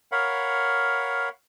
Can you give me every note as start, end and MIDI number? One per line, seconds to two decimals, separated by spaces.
0.12 1.29 70
0.12 1.29 73
0.12 1.29 77
0.12 1.29 78
0.12 1.29 83